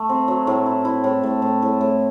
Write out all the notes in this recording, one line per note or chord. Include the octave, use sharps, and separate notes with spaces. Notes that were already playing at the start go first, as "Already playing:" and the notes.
Already playing: A3
C4
F#3
A2
E4
E4
A2
A2
A2
A2
A2